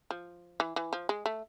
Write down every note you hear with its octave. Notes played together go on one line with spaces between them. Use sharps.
F3
E3
E3
F3
G#3
A3